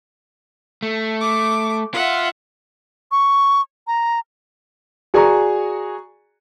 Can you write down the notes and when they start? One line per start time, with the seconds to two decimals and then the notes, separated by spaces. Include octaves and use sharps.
0.82 A3
1.21 D6
1.94 F4 E5 F#5
3.12 C#6
3.87 A#5
5.14 F#4 G#4 D5 G#5 A#5 C#6